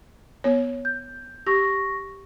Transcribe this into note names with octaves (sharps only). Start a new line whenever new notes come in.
B3 C#5
G6
G4 C#6 A#6